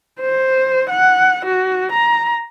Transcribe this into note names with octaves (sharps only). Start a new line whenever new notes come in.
C5
F#5
F#4
A#5